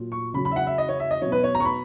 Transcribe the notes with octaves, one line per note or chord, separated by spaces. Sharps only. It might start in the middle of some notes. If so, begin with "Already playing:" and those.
Already playing: A#2 F#3
C#6
C#3 F#3 B5
B5
E5
F#5
E5
D#5
C#5
E5
D#5
B2 F#3 C#5
B4
C#5
A#5
C#6
B5